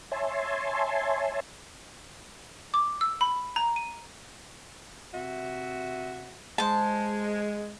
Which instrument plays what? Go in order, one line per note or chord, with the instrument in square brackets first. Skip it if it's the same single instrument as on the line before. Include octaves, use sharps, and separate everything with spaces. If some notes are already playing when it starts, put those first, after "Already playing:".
[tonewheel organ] C#5 E5 G#5 A5 C6
[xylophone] D6
E6
B5
A#5
D#7
[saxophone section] C3 F#4 E5
[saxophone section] G#3 [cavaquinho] C5 A5